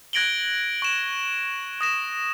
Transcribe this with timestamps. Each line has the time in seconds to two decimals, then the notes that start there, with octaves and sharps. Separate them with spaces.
0.13 F#6 G#6 A#6 D7 F#7 G7
0.82 C#6 E7
1.81 D#6 A#6 E7